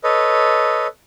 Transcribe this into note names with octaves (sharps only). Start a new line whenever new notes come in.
A4 B4 C#5 D#5